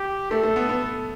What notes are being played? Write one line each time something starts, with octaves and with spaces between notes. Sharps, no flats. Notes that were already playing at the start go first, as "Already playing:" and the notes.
Already playing: G4
A3 A4
A3
B3
B3